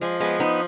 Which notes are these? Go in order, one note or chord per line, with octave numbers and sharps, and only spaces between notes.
F3 G#3
G#3 B3
B3 D#4